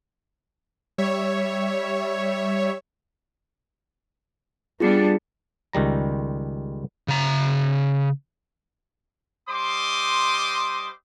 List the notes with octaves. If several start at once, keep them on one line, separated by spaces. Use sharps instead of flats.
G3 C#5 E5
G3 B3 D4 F4 G#4 C#7
C#2 D#3 G3 A#5
C#3 A#5
G3 C5 D#5 C6 D6 D#6